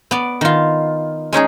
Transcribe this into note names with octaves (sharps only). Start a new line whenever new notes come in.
B3 D5
D#3 F4
G#3 C#4 D#4 G#4